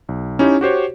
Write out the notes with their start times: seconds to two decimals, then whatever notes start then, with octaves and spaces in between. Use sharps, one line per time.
0.09 B1
0.39 C#4 D#4 E4 G4 C#5
0.61 F#4 G4 C5 C#5